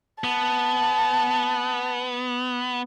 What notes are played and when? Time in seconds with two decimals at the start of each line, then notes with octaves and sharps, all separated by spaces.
0.24 B3 A5